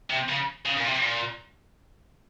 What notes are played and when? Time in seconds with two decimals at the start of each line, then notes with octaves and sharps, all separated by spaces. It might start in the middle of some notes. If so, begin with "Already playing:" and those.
0.10 C3
0.29 C#3
0.65 C#3
0.77 A#2
0.84 C3
1.02 A#2